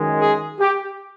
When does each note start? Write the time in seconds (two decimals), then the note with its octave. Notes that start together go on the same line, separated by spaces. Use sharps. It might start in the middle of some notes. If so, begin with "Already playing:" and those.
Already playing: F#2 D#3 G#3
0.21 G#4
0.59 G4